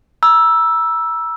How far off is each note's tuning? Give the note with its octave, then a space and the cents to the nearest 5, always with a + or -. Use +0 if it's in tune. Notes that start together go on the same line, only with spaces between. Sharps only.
A#5 +40 E6 +0